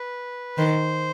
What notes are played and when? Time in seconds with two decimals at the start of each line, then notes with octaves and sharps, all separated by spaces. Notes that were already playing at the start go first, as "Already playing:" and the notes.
Already playing: B4
0.57 D#3 C5